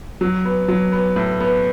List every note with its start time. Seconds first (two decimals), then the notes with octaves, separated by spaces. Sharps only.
0.21 F#3
0.45 B3
0.68 F#3
0.92 B3
1.16 A2
1.40 B3